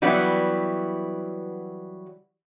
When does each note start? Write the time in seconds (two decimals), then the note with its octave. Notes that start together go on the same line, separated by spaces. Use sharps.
0.02 E3 F#3 G3 B3 E4